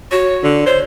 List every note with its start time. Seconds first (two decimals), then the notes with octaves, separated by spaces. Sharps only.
0.12 F#4 C#5
0.43 D3
0.66 C5 C#5